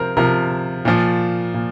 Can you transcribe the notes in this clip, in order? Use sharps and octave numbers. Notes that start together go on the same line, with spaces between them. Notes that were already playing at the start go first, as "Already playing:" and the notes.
Already playing: C3 F3 A#4 C5
C3 F3 A#4
A#2 F3
A#2